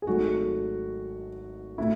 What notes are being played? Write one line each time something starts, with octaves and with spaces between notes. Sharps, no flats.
G#4
G#1 G#2 F#3 A3 F#4
A2 E4